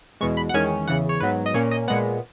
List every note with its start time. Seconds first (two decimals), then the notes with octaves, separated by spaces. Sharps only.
0.21 E2 B2 G#3 C#6
0.37 B5
0.49 F#5
0.54 E2 D#3 G#3 C#4 G#5
0.87 E2 C#3 E3 F#5
1.09 C#5
1.20 G#2 F#3 B3 B4
1.46 D#5
1.54 A#2 A#3 C#4 C#5
1.71 D#5
1.88 A#2 G#3 B3 F#5